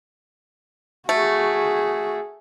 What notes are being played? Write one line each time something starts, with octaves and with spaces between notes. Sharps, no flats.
A3 F#4 G#4